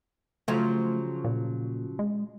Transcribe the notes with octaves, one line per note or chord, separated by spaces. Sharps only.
C#3 F3 F#3 A3
A#2
G#3